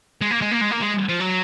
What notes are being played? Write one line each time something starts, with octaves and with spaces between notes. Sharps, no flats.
G#3
A#3
G#3
A#3
G#3
A#3
G#3
F3
F#3